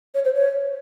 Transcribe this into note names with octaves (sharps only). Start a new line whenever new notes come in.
C#5
C5
C#5